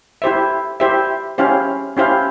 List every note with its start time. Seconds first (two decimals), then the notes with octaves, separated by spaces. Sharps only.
0.22 E4 G4 C5 E5
0.80 E4 G4 C5 E5
1.38 C#4 E4 G4 C5 F5
1.97 C#4 E4 G4 C5 F5